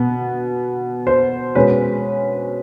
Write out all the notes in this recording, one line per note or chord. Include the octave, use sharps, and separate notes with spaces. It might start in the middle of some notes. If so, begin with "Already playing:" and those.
Already playing: B2 B3
C5
B2 G#3 C#4 B4